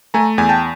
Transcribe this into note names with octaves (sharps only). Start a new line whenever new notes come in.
A3 G#5 A#5
E2 G#5
G5 A5